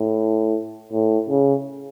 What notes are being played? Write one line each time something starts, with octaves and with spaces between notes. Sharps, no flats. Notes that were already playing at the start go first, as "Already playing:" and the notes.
Already playing: A2
A2
C#3